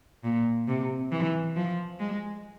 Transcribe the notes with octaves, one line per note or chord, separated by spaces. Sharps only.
A#2
C3
E3
F3
G#3